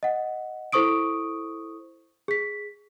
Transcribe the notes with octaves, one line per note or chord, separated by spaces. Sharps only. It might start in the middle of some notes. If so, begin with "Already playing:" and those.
D#5 F#5
E4 A4 C5 C#6 D#6 D7
G#4 B6